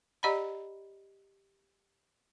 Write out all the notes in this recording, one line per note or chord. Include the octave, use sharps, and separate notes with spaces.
G4 D5 D#5 F#5 A#5 B5